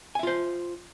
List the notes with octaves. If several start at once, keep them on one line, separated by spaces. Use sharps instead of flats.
F4 C5 E5 G#5